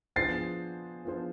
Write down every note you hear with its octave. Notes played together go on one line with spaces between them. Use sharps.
F3 B3 D4 G#4 C5 A6 C7
F3 B3 D4 G#4 C5